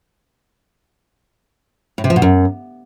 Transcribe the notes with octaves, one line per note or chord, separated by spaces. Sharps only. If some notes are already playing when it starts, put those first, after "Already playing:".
A2
C3
F3
B2
F#2